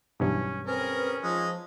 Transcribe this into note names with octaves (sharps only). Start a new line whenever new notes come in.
B1 G2 E3 C#4
C4 C#4 G#4 A#4 B4
F3 G#3 D#4